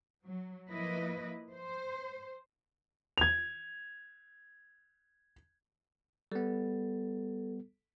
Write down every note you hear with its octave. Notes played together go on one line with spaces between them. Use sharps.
F#3
F3 A#3 E4 B4 D#5
C5
G#6 F7
G3 B3 A4